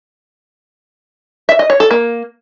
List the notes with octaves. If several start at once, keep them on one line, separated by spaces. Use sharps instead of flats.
E5
D#5
C#5
A4
A#3